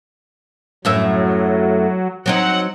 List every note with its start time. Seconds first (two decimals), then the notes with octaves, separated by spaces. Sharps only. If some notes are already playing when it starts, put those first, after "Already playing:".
0.85 F#2 A2 F#3 E5
2.26 F#3 C4 D#4 F#5